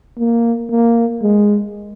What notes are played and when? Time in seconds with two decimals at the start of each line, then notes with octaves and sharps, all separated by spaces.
0.18 A#3
0.70 A#3
1.22 G#3